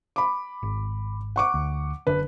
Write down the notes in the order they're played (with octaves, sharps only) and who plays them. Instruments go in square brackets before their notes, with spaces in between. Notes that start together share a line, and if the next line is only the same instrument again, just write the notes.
[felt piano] B5 D6
[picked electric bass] G#1
[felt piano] F#5 C#6 D6
[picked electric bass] D2
[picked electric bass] F#1 D3 D4 [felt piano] B4